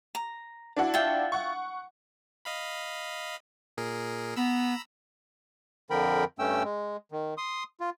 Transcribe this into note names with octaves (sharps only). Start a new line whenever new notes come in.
A#5
D4 E4 F#4
F4 E5 G5
F#5 C#6
D#5 F5 B5
A#2 G#4 A#4
B3 A#5 B5 E6
F2 D3 F3 A#4 G5 B5
G2 A3 C#4 G5 E6
G#3
D#3
C6 D#6
F4